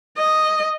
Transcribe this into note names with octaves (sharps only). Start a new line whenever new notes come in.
D#5